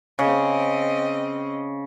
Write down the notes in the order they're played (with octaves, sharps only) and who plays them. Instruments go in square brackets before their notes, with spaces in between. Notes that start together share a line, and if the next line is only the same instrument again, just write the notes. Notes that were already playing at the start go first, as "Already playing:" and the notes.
[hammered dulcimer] C#3 [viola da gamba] C4 D#5